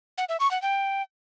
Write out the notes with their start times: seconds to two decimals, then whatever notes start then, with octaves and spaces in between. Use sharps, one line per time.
0.18 F#5
0.29 E5
0.40 C#6
0.51 F#5
0.62 G5